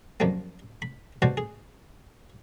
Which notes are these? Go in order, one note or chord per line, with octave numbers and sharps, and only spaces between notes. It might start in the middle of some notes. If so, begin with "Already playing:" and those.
F#2 D#3 F3 G3 A#3
B5
B2 G3 F#4 C5 D5 A5
G#4